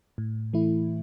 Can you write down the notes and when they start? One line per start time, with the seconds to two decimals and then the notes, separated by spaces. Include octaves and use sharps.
0.18 A2
0.53 E3 A3 E4